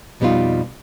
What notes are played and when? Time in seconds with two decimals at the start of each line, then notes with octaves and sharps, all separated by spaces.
0.20 F2 B2 G3 B3 D#4 F4